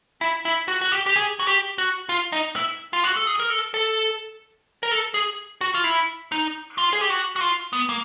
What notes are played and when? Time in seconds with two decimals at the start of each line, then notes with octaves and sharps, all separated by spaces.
0.21 E4
0.45 E4
0.68 F#4
0.81 F#4
0.92 G4
1.06 G4
1.16 G#4
1.40 F#4
1.47 G4
1.78 F#4
2.09 F4
2.32 D#4
2.56 E4
2.93 F4
3.04 F#4
3.16 A4
3.27 G#4
3.40 A#4
3.50 A4
3.74 A4
4.83 A#4
4.91 A4
5.14 G#4
5.61 F#4
5.75 F4
5.84 E4
6.32 D#4
6.78 F4
6.93 G#4
7.01 G4
7.10 F#4
7.36 F#4
7.41 F4
7.73 B3
7.89 A#3